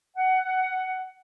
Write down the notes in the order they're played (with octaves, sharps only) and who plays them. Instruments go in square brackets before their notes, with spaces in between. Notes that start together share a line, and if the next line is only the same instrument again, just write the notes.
[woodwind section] F#5